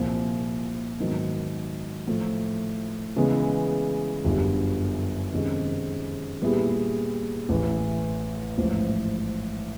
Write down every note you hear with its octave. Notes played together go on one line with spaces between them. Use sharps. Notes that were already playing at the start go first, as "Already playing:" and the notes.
Already playing: C2 A#2 F3
G#2 D#3 F#3 B3
A2 F3 A3
C#3 E3 G#3 B3
G1 F#2 D3 G3
F2 C3 D#3 G#3 C#4
A#2 G3 B3 E4 G#4
A1 A2 E3
A1 G#2 F3